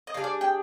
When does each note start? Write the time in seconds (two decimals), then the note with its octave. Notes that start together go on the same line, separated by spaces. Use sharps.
0.07 D#5
0.14 G3 D4 G#4 F5
0.24 D5
0.41 G5